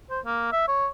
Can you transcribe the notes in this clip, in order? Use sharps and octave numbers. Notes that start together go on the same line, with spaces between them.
C5
A#3
E5
C#5